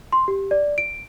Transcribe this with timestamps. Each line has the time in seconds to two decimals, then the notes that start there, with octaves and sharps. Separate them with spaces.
0.13 C6
0.28 G4
0.51 D5
0.78 D7